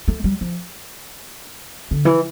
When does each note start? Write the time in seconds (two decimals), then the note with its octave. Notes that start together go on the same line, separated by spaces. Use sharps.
0.08 A3
0.24 G3
0.41 F3
1.91 D3
2.05 E3